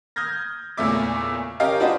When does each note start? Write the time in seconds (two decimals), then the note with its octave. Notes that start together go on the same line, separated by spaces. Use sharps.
0.16 D#6 F6 G6 G#6 A#6
0.77 E2 A#2 C#3 A3 E5 D6
1.60 C#4 G4 A#4 D#5 F5
1.80 D4 F4 F#4 B4 C5 D#5